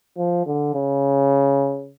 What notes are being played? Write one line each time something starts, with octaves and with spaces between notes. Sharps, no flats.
F3
D3
C#3